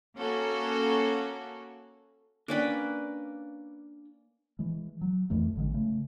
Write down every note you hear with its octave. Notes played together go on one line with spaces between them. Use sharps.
A#3 C#4 F#4 A4
A#3 C#4 D4 B4 D5 G5
E3 G#3
F#3
F2 E3 A3
A1 D3 G3 G#3
C#3 A3